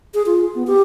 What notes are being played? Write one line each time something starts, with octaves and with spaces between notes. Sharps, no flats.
G#4
F4
B3
G4